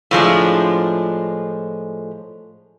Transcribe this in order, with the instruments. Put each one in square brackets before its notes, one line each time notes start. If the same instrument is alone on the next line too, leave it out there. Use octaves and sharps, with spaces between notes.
[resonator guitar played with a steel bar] A2 F3 G#3 D4